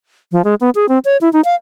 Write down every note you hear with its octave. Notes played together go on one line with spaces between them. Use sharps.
F3
G#3
B3
G#4
C4
C#5
E4
D#4
F5